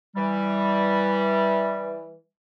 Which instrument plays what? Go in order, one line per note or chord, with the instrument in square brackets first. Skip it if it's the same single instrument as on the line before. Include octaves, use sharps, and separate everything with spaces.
[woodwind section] E3 G3